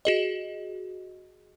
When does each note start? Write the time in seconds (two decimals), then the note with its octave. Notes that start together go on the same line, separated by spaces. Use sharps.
0.05 F#4 G#4 D#5